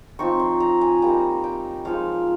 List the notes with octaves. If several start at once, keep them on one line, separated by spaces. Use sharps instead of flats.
F3 C4 D#4 C#6
C6
A#5
G#5
G3 A#3 D#4 A#5
G5
F3 G#3 D#4 F5